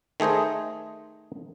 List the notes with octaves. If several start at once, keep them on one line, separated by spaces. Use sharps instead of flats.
D#3 A3 G#4 C5 D#5